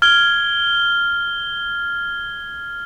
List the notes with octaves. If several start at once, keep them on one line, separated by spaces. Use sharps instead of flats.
F6 G#6 G7